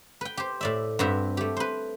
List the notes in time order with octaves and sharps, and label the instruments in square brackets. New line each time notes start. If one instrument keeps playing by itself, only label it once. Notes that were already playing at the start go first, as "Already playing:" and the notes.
[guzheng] B4 G5
G4 C5
A2 D5 E5
G2 C4 F#4 G4 E5
A3 G4
B4 C5